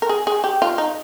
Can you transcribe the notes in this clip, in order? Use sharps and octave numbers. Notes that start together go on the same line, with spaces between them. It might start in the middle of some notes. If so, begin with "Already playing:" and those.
A#4
G#4
G#4
G4
F4
D#4